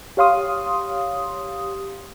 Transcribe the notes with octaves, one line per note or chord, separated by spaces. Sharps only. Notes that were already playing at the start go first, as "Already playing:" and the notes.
G4 C#5 F5 C6 D#6